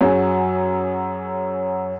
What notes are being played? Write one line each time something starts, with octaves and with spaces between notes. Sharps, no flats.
F#2 F#3 C#4 G#4